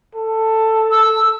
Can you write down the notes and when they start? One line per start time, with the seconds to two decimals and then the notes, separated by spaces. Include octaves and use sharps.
0.15 A4
0.91 E6